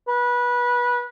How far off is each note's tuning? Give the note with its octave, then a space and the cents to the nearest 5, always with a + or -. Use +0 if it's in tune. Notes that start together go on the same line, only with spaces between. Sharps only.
B4 -20